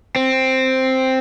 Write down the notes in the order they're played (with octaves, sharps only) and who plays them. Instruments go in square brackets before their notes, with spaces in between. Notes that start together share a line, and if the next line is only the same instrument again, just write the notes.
[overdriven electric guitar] C4